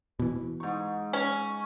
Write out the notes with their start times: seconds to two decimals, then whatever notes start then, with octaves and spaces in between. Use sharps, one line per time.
0.19 B2 E3
0.60 G#2 C#6
1.13 C#4